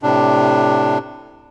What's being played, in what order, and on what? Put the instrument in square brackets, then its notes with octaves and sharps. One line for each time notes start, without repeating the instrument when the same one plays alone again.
[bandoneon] A2 C3 D4